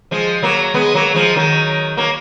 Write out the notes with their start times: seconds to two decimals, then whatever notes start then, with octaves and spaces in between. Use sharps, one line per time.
0.11 F3 G#3
0.42 F#3 A#3
0.74 G#3 B3
0.94 F#3 A#3
1.14 F3 G#3
1.36 D#3 F#3
1.97 F#3 A#3